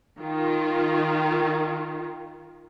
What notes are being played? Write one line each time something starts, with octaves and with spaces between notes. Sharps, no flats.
D#3 F4